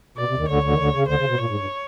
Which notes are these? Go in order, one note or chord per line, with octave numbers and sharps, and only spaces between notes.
B2 D5
C3
D#2 D#3
D2 D3 C#5
D2 D3
D#3
D2 D3
C#3
D2 D3 C5
C#3
B2
A#2 C#5
G#2
G2